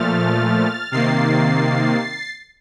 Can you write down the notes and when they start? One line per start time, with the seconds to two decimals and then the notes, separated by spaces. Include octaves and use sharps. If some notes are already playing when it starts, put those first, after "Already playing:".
Already playing: A#2 F3 A3 F6 A6
0.92 C3 D#3 A#3 A6 C7